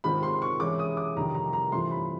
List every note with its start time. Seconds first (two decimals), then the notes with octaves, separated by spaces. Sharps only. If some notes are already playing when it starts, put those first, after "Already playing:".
0.04 G#2 D#3 G#3 C4 F4 B5
0.23 C6
0.42 C#6
0.60 E3 G#3 C#4 E4 D6
0.79 D#6
0.97 D6
1.16 F2 C3 D#3 G3 A#5
1.35 A#5
1.53 A#5
1.72 G2 E3 A3 C4 F4 C6
1.91 B5